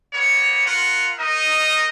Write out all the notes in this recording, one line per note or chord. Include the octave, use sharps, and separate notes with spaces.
A#3 B3 C#5
F4 A#4 F#5
D#4 A#4 D#5